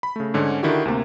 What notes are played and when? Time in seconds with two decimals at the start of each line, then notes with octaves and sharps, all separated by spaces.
0.03 B5
0.16 C#3 A3
0.34 G#2 D3 C#4
0.63 D3 D#3 E4 F#4 G4
0.85 D2 C3 A#3